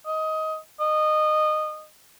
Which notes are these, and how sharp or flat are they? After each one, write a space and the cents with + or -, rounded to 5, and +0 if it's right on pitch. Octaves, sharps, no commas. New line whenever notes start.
D#5 +20
D#5 -20